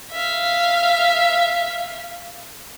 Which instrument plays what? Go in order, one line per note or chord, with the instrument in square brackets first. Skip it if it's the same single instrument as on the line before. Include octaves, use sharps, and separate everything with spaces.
[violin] E5 F5